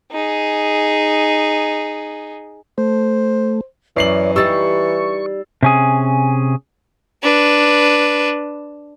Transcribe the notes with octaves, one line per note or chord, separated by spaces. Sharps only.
D#4 G#4
A3 C5
F#2 E3 C#5 D5 C7 F#7
G3 D#4 C#6 E6 A6
C3 C#4 G#4
D4 B4